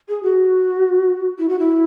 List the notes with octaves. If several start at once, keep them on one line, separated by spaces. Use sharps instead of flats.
G#4
F#4
E4
F#4
E4